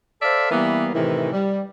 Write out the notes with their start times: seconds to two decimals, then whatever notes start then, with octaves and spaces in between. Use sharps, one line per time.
0.22 A4 C5 D5 E5 F5
0.52 E3 G3 A#3 B3
0.94 A2 C3 D#3 E3
1.33 G3